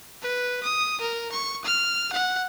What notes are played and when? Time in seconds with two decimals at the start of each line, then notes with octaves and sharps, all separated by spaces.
0.22 B4
0.63 D#6
1.01 A#4
1.32 C#6
1.65 F6
2.13 F#5